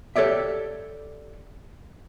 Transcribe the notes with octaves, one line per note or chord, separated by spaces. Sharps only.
G4 A4 C#5 D5 E5